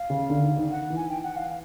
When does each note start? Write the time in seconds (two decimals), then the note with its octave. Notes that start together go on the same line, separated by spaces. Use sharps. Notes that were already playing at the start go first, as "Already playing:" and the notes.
Already playing: F5
0.10 C#3
0.30 D3
0.44 D#3
0.57 D#3
0.71 F#5
0.90 E3
0.96 G#5
1.09 G5
1.23 F#5
1.36 F5